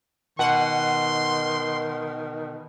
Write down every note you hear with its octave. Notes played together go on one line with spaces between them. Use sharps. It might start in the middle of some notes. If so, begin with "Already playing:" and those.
B2 D#3 F#5 C6